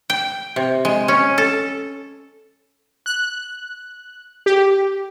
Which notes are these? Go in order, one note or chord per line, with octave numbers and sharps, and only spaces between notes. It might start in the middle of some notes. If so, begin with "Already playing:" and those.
G5
C3
G#3
C#4
A4
F#6
G4